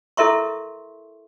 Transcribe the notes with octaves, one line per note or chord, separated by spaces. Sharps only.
E4 A4 A#4 E5 C6 C#6